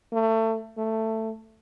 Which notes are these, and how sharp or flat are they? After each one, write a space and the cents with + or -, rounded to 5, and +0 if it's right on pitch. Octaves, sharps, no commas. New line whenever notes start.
A3 +25
A3 +10